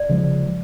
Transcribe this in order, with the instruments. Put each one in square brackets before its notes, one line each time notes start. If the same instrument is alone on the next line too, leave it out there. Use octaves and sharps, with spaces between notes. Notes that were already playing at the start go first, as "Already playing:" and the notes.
Already playing: [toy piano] D5
[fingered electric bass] C#3 F3 G#3